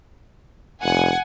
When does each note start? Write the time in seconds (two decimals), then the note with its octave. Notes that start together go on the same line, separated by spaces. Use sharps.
0.83 F1 F#5 G#5